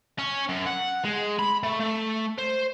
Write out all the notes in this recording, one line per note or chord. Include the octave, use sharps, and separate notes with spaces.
C#4
F#2
F#5
G#3
B5
A3
A3
C5